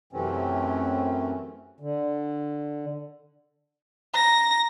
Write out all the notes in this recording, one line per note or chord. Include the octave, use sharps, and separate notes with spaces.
F#2 C3 E3 A3 C4 C#4
D3
A#5 A#6